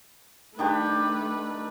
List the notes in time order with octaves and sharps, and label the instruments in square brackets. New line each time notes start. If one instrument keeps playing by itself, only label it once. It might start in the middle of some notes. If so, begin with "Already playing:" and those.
[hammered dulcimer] D#3 D4 G4 [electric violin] A3 B4